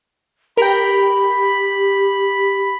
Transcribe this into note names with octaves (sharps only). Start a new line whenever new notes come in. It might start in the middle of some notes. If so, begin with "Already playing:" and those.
G4 A#4 G5 B5